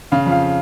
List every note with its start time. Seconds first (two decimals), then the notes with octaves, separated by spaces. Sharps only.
0.12 C#3 F5
0.26 F2
0.32 F5